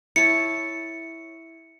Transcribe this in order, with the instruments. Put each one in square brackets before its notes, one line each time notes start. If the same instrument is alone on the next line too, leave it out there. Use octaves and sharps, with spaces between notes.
[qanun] E4 C#5 A5 [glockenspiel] C#7